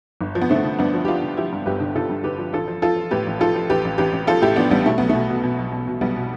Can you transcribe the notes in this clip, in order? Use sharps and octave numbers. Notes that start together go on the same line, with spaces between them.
G1
F3
B3
D3 A3 C4
D3
G2 B3 D4
F3
G4
F3 D4 F4
D3
F3 E4 G4
G2
G1 G4 B4
D3
D3 F4 A4
G2
D3 G4 B4
F3
A1 F4 A4
F3
F3 F4 A4
F3
A2 G4 B4
A1
F3 F4 A4
F3
A1 G4 B4
A1
A1 G4 B4
A1
F3 F4 A4
A2 E4 G4
F3 B3 D4
A1 G3 B3
B2 A3
B1 B3
A3
B2
B2
B2
B1
B2
B2
B1 G3 B3
B2